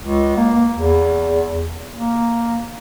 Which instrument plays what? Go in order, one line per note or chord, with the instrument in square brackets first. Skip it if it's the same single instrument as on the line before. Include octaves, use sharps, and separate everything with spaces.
[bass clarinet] C#2
A#3
E2
A#3